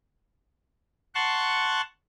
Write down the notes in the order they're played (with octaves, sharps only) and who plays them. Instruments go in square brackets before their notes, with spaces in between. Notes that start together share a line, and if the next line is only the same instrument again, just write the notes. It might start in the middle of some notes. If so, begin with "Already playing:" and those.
[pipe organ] F#5 A5 C6 C#6 F#6